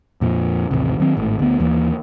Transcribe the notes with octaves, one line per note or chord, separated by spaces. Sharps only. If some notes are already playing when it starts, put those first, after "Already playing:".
F2 A#2 F3
A1 D#2 C3
D#3 F#3 C4
G#1 A2
D2 B3
D#2 E3 A#3